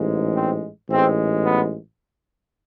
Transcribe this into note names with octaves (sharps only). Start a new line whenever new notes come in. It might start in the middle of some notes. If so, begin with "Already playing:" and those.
Already playing: A1 G#2 G#3
C4
A1 G#2 G#3 C4
B3